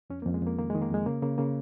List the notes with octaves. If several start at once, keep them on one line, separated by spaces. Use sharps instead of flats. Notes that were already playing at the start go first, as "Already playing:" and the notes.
F2 C#4
A#3
F2
G#3
F2 A#3
D#3 A#3
G#3
D#3
A#3
F2 G#3
C#3 A#3
C#3 A#3
C#3 A#3